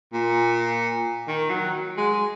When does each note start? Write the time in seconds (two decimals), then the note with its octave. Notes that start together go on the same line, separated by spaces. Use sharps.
0.13 A#2
1.28 D#3
1.50 F#3
1.97 G#3